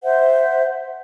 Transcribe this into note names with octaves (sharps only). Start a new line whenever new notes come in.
C5 E5 F#5